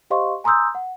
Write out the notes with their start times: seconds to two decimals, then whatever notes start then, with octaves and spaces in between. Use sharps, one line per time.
0.10 G4 C5 D#5 F5 C6 C#6
0.44 G#5 A#5 C6 D#6 E6 G6
0.75 F#5